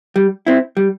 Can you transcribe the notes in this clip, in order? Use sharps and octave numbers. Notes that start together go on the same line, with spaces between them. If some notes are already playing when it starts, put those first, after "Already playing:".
G3
C4 E4
G3